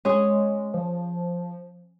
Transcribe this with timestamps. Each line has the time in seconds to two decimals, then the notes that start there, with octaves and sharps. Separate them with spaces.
0.05 G#3 C#4 G#4
0.74 F3